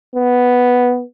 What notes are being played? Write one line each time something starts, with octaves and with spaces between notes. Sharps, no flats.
B3